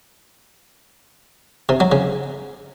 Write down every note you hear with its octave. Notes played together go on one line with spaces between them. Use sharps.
C3
F#3
C#3